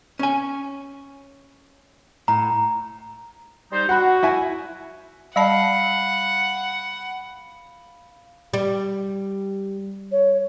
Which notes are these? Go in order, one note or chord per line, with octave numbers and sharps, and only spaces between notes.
C#4 G#5
A2 A#5
G3 D#4 C5
F#4 F#5 B5
E4 E5 G#5
G3 D5 F5 F#5 A5 B5 C7
G3
C#5